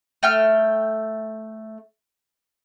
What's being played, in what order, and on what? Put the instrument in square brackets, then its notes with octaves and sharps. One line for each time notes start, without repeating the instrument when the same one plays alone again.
[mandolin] A3 G5 F6